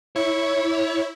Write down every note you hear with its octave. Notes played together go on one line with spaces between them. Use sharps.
E4 C#5